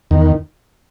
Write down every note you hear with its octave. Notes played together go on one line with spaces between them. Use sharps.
E2 D#3